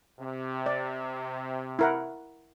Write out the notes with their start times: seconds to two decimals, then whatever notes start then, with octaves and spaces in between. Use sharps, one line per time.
0.19 C3
0.66 D5
1.79 E4 A#4 F#5